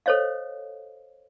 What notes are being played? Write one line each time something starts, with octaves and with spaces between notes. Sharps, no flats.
A4 C5 C#5 D#5 F5